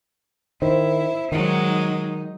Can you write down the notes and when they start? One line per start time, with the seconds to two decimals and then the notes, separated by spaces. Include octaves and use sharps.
0.62 D#3 E4 C5
1.32 D#3 F#3 G#3 D#4